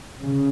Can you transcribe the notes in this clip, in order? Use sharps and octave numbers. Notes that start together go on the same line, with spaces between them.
C#3